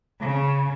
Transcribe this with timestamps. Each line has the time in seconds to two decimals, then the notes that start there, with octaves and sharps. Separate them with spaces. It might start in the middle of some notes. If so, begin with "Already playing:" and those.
0.21 C#3